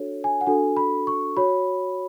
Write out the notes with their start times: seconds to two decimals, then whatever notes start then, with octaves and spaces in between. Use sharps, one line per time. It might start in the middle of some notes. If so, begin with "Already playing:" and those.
Already playing: D4 F#4 A4 C#5
0.24 G#5
0.41 F#5
0.47 D4 F#4 A4 G#5
0.77 B5
1.07 C#6
1.37 F#4 C#5 B5